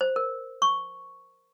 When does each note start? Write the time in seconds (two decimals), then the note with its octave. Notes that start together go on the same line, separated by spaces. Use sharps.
0.01 C5
0.16 A#4
0.62 C#6